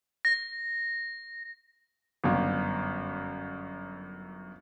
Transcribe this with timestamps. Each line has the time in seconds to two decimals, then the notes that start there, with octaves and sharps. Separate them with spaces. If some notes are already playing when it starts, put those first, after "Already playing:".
0.25 A#6
2.24 G1 F#2